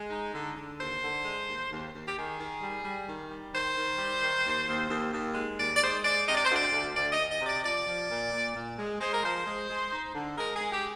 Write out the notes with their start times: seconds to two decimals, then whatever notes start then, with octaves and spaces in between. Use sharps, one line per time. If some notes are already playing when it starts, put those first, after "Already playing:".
Already playing: G#3
0.10 D#4
0.33 D3
0.55 D3
0.78 D#2 C5
1.01 D3
1.23 G#3
1.46 D#2
1.69 D#2
1.92 D#2
2.06 G4
2.15 D#3 G#4
2.38 D#3
2.61 G3
2.84 G3
3.06 D#3
3.29 G3
3.52 D#3 C5
3.74 D#3
3.98 G3
4.20 D#3
4.44 D#2
4.66 D#2
4.89 D#2
5.12 D#2
5.35 G#3
5.57 D#2 D5
5.74 D5
5.80 G#3 C5
6.02 G#3 D5
6.25 C3 D#5
6.35 D5
6.44 C5
6.48 D2
6.54 D5
6.71 D2
6.94 D2 D5
7.11 D#5
7.17 D2
7.29 D#5
7.40 C3
7.45 D5
7.63 F3 D5
7.85 F3
8.08 A#2
8.31 A#2
8.53 A#2
8.77 G#3
8.99 G#3 C5
9.12 A#4
9.22 F3 C5
9.45 G#3
9.68 G#3
9.90 D#4
10.14 D3
10.36 G#3 A#4
10.53 G#4
10.59 G#3
10.71 G4